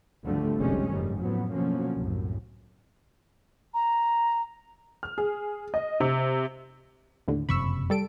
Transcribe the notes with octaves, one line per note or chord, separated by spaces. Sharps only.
G#1 D2 D3 F3 G3 A3
F1 B1 C3 G3 G#3 C#4
F#1 F2 G#2 D#3 G3
A2 F3 F#3 B3
B2 D3 F3 F#3 A#3 C#4
C2 F#2 A2
A#5
F6
G#4
D#5
C3
D#2 A2 D3
F#1 F2 C3 B5 C#6 E6
G3 A4 D7